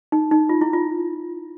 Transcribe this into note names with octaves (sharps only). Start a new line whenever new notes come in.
D#4
D#4
F4
E4
F4